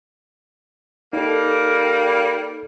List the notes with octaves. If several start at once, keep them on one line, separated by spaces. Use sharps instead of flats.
G3 A#3 D#4 A4